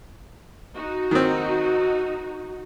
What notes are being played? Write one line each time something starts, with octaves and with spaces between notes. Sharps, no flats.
D#4 F#4
D#3 C4